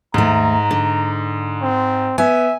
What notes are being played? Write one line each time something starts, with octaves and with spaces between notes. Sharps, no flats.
D#2 G#2 A3 A#5
D3
C4
B3 E5 G#5